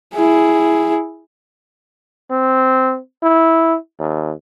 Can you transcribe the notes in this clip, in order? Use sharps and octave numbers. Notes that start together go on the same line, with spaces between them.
E4 G#4
C4
E4
D#2